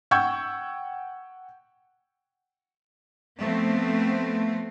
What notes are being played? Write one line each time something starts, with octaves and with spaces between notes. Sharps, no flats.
F#5 G5 C#6 E6 G6 G#6
F3 A3 B3 C4